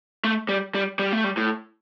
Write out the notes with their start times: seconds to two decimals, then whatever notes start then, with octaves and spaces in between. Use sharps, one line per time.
0.24 A3
0.49 G3
0.75 G3
0.99 G3
1.12 A3
1.24 G3
1.37 A2